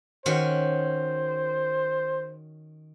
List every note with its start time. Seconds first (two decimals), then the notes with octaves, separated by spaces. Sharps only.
0.26 D#3 C#4 F#4 C5